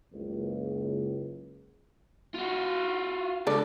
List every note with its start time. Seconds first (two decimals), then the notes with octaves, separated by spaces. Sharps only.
0.13 F#1 C#2
2.34 F4 F#4
3.47 C#2 D4 A4 D5